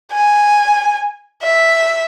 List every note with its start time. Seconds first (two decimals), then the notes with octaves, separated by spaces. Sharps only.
0.13 G#5
1.42 E5